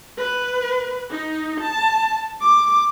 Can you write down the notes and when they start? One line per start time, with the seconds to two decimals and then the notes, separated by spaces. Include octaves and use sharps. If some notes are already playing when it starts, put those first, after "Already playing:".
0.17 B4
1.10 D#4
1.60 A5
2.41 D6